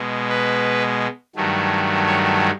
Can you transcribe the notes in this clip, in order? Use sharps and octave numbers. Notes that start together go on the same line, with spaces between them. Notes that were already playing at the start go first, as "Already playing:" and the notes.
Already playing: B2 G#3
B4
G2 D#3 F#3 A3
C#5